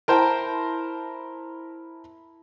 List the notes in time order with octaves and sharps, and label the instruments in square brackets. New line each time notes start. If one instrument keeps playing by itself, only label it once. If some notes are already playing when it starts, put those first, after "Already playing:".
[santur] E4 A5 A#5 [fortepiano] A#4 C5 G5